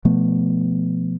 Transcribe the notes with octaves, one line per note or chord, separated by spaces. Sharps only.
B2 F3 A3 B3